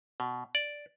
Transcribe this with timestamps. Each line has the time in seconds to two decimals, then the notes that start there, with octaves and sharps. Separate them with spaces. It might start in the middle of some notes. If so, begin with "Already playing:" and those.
0.20 B2
0.55 D5